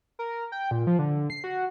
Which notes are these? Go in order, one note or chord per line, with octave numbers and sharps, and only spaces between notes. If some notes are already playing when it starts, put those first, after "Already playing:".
A#4
G5
A#2
F3
D3
C7
F#4